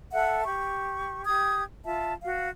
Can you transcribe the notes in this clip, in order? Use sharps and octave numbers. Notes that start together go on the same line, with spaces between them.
A4 E5 F#5
G4 C#6
G4 D#6 G#6
F4 E5 A5
F#4 F5